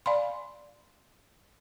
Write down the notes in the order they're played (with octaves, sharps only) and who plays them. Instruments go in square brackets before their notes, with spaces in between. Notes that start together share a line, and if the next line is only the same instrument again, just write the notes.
[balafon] D5 F5 G#5 B5 C6